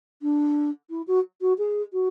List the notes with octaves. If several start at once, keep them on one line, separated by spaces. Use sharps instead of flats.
D4
E4
F#4
F#4
G#4
F#4